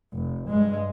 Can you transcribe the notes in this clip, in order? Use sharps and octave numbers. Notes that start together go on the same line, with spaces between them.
F1
G2 G#3